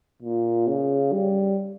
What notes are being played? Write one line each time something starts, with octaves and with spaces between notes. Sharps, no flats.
A#2
C#3
G3